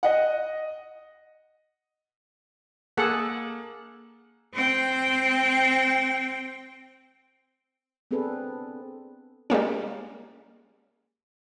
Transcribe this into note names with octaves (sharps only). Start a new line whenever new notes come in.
D#5 F#5
A#3 G#4 A4 F#5
C4 G5
B3 C4 D4 G#4 A4 B4
G3 G#3 A#3 C#4